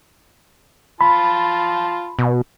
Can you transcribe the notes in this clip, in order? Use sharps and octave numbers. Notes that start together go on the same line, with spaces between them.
F4 A5 B5 C6
B2